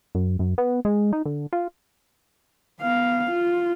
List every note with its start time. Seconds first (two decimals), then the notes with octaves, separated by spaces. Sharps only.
0.15 F#2
0.39 F#2
0.58 B3
0.85 G#3
1.13 D#4
1.26 D3
1.53 F4
2.81 B3 F5
3.31 F4